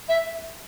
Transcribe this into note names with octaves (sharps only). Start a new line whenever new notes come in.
E5